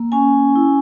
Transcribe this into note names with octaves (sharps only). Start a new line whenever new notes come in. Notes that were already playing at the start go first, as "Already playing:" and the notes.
Already playing: A#3
C#4 G#5
E4